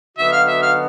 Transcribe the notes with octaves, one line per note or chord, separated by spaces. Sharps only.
D3 F#3 B3 D#4 F#4 E5
F5
E5
F5